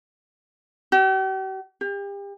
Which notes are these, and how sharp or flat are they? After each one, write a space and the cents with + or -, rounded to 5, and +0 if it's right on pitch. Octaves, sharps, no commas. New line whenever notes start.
G4 -45
G4 +35